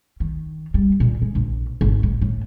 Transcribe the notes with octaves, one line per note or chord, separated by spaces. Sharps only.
D#3
G3
A#2
G#3
A#1
G#1
A2
A2